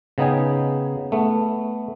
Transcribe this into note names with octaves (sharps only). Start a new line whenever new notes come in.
C#3 B3 D#4 G5 G#5
A3 B3